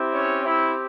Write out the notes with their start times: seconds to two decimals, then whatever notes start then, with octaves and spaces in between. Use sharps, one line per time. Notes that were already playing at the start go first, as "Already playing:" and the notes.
Already playing: C4 E4 G4
0.13 C#4 C#5
0.45 E4 E5